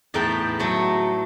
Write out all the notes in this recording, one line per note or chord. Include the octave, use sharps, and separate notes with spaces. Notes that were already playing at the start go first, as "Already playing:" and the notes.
E2 A2 D#4 B4 G5 A5
F#3 A3